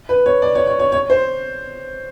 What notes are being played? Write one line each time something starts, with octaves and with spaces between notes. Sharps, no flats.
B4
C#5
D5
C#5
C#5
C#5
C#5
C5